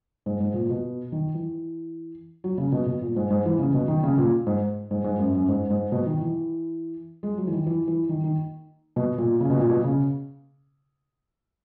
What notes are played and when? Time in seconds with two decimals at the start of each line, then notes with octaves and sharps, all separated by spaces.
0.26 G#2
0.40 G#2
0.54 A#2
0.70 B2
1.12 D#3
1.34 E3
2.44 F#3
2.58 C#3
2.72 B2
2.86 B2
3.02 A#2
3.16 G#2
3.30 G#2
3.45 E3
3.59 C#3
3.74 B2
3.88 D#3
4.03 C#3
4.18 A#2
4.47 G#2
4.91 G#2
5.04 G#2
5.19 F#2
5.34 F#2
5.48 G#2
5.70 G#2
5.92 B2
6.06 D#3
6.21 E3
7.23 G#3
7.38 F#3
7.47 E3
7.52 D#3
7.66 E3
7.88 E3
8.09 D#3
8.24 D#3
8.96 B2
9.18 A#2
9.40 C#3
9.50 B2
9.59 A#2
9.70 B2
9.84 C#3